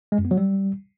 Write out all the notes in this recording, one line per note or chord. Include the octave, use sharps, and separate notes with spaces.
G#3
F#2
B3
F#3
G3